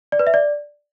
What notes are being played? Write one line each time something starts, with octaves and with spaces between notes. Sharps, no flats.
D5
B4
E5
D5